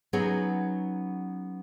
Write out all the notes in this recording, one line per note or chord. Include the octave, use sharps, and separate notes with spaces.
F#3 B3 C#4 D#4 G#4 C#5